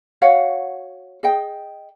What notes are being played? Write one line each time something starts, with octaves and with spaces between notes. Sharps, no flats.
F#4 C#5 F5 F#5
G#4 D#5 G5